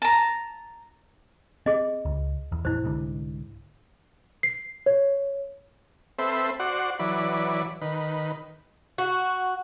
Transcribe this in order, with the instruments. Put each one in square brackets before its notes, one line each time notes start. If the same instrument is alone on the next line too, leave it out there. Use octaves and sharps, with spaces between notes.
[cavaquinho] A5 A#5
[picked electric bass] C4 [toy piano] G#4 D#5
[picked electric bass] C#2
E2
[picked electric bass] A#1 F2 [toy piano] E4 C5
[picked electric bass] C2 G#2 D3
[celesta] C7
C#5
[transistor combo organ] C4 A4 B4 C5 E5
F#4 C5 D5 F#5
E3 F#3 B4 D5
D#3 B4
[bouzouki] F#4